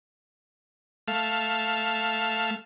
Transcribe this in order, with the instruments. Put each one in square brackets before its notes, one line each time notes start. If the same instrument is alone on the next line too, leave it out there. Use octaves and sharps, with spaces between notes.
[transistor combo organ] A3 F5